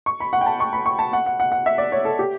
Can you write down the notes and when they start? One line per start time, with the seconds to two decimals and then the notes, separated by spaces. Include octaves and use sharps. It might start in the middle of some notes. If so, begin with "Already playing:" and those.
0.06 C#6
0.20 B5
0.33 F#5
0.41 G5
0.46 A5
0.60 C#6
0.73 B5
0.86 C#6
0.99 A5
1.13 F#5
1.26 F#5
1.40 F#5
1.52 F#5
1.66 E5
1.78 D5
1.92 C#5
2.05 A4
2.19 G4